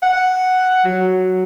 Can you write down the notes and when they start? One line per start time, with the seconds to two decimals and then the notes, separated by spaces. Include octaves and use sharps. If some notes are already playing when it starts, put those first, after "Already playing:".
0.03 F#5
0.85 F#3